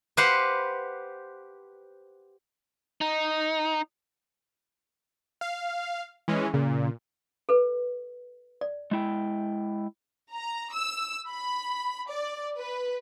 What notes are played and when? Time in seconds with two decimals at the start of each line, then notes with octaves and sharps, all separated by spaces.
0.17 G4 B4 C5 F5 F#5
3.01 D#4
5.41 F5
6.28 E3 G#3 C#4
6.54 A#2 C#3
7.49 A4 B4
8.61 D5
8.91 G#3 E4 G5
10.33 A#5
10.73 E6
11.27 B5
12.10 D5
12.56 B4